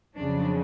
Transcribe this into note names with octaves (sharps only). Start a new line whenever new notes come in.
F2 C#3 F#3 D4